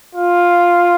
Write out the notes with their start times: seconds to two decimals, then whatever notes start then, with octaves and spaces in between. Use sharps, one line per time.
0.15 F4